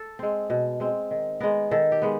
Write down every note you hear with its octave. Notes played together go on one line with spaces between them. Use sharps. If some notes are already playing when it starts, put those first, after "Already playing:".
Already playing: A4
G#3 C4
B2
G#3 C4
D#3
G#3 B3 A#4
D#3 A4
G4
G#3 B3